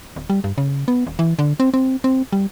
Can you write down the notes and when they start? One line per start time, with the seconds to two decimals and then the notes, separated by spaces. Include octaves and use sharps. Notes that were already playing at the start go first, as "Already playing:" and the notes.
0.16 D1
0.30 G3
0.44 G2
0.58 C#3
0.88 B3
1.07 D#1
1.19 E3
1.39 D3
1.60 C4
1.74 C4
2.04 C4
2.33 G3